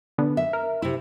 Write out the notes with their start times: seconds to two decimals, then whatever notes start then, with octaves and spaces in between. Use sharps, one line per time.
0.18 D3 B3
0.37 E5
0.53 A#4
0.82 C3 E4